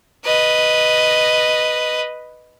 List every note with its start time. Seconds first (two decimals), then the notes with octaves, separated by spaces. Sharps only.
0.25 B4 D#5